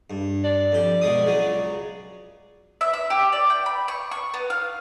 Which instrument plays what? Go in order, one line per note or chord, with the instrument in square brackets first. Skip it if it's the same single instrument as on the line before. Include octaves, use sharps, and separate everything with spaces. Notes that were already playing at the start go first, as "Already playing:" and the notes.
[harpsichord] G2
[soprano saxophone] D5
[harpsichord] F2 G4
B2 G#3 D#6
C#2 C#3 F#3
[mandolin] E5
E5
G4
D5
G5
B5
C#6
C#6
B3
F5